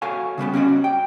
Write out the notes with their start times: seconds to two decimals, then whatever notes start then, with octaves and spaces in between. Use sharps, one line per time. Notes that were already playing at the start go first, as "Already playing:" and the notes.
0.02 F#4 A4 C#5 F5 G#5
0.38 C#3 G3 B3 G4
0.54 C#4 E4 F#4 D5 D#5
0.84 G5